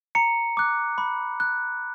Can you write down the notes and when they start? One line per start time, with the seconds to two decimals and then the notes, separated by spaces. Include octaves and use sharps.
0.15 A#5 C#7
0.57 D6 F#6
0.98 B5
1.40 F#6